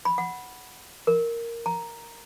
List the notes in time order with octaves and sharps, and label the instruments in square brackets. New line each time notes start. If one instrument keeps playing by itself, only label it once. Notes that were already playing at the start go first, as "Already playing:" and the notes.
[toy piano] B5
F#5
A#4
A#5